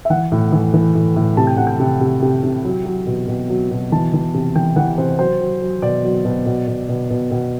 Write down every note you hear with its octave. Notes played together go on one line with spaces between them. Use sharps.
E5
E3 F#5
A2
E3
E3
A2
A2
C3 A5
G5
C3 F#5
G5
C3
C3
C3
C3
F#3
F#3
B2
B2
F#3
B2
E3 A5
E3
C3
E3 G5
E3 F#5
C3 C5
F#3 C5
F#3
F#3
B2 D5
F#3
B2
B2
B2
B2
B2
B2